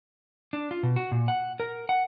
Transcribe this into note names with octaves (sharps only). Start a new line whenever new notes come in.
D4
F4
B2
F#4
A#2
F#5
A#4
F#5